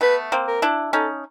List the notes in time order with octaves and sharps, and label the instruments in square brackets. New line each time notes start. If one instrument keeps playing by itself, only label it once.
[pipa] A3 B3 [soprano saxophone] B4
[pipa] A#3 C4
[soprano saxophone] A#4
[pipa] D4 E4
[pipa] C#4 D#4 [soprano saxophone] A4